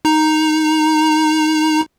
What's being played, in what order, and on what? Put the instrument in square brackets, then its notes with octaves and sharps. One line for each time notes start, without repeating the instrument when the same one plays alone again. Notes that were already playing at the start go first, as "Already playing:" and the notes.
[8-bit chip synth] D#4 A#5